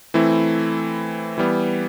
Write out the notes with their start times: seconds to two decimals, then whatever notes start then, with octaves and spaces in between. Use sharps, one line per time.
0.14 E3 A3 C4 E4
1.38 E3 G3 B3